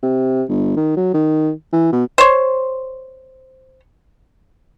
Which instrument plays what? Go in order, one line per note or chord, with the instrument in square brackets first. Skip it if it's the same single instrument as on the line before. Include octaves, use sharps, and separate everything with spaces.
[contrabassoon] C3
G1
D#3
F#3
D#3
E3
B2
[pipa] C5 C#5